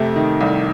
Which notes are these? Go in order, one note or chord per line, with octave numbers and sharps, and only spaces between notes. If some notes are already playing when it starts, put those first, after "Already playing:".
Already playing: F2 C3 A3
D#3
C2